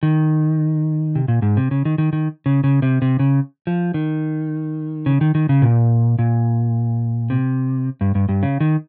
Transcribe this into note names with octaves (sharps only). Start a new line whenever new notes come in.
D#3
C3
A#2
G#2
C3
C#3
D#3
D#3
D#3
C#3
C#3
C3
C3
C#3
F3
D#3
C#3
D#3
D#3
C#3
A#2
A#2
C3
G2
G2
G2
C#3
D#3